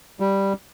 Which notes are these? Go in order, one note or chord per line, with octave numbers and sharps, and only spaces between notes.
G3